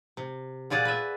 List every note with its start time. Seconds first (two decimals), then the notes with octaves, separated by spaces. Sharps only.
0.17 C3
0.70 A#2 F4 G#4 D5 F#5
0.85 B4 E5